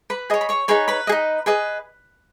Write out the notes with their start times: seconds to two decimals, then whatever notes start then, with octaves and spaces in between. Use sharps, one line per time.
0.10 B4 B5
0.30 G#4 C#5 D#5 D#6
0.41 B5
0.49 C#5 C#6
0.68 D#4 G#4 B4 C#5 B5
0.88 B4 B5
1.07 G#4 D#5
1.12 D#4
1.46 G#4 B4 D#5